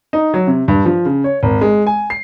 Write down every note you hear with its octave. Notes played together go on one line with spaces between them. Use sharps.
D#4
F#3
C3
G2
F3
C#3
C#5
G#1
G#3
G#5
C7